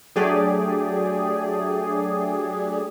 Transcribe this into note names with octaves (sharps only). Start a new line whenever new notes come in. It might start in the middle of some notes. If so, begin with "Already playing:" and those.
F#3 A3 D4 G4 G#4 D5